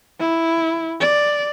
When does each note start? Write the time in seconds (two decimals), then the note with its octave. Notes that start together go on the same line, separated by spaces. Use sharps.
0.20 E4
1.00 D5